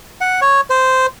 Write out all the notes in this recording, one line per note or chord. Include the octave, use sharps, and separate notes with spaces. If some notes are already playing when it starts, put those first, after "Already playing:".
F#5
C#5
C5